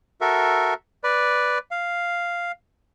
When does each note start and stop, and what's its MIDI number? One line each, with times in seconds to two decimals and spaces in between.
0.21 0.74 66
0.21 0.74 69
0.21 0.74 70
0.21 0.74 76
1.04 1.58 71
1.04 1.58 74
1.71 2.52 77